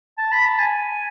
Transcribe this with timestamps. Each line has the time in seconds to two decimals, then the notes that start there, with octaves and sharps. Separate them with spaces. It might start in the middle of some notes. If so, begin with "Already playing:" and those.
0.18 A5
0.32 B5
0.46 A5
0.59 G#5